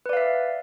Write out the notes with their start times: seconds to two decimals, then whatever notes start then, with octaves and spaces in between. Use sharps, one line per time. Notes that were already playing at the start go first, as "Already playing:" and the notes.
0.06 B4
0.09 D5
0.13 F5
0.17 E5